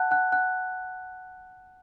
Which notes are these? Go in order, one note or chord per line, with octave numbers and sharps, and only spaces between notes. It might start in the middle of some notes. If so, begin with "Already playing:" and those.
Already playing: F#5 A5 F#6
F#5 F#6
F#5 F#6